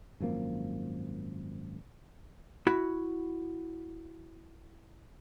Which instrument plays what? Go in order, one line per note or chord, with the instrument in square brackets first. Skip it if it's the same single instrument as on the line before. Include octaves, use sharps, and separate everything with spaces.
[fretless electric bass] G#1 F#2 F3 A#3
[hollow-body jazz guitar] E4 F#4 B5